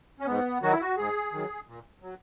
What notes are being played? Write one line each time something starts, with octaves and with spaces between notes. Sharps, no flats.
C#4
G#2 B3
D#3 F#3 F#4
E4
F#4
G#2 G#4
D#3 F#3
A#2
F#3